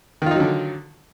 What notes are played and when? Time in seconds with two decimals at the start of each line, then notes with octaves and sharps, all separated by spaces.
0.22 D#3
0.26 F4
0.31 D#4
0.36 F#3
0.40 D3